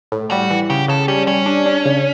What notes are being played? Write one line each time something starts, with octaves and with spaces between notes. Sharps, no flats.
A2
G3 F#4
E3
C#3 G4
C#3 A4
G3 C#4
G3 C#4
D4
D4
C#3